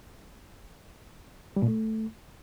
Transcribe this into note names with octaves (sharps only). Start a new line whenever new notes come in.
G3
A#2
A3